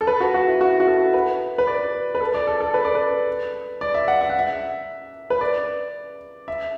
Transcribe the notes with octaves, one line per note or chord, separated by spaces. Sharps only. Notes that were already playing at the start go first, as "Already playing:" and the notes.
A4
B4
F#4
F#4
E4
F#4
F#4
A4
B4
B4
D5
B4
A4
D5
A4
A4
B4
D5
B4
D5
E5
F#5
E5
F#5
E5
B4
D5
E5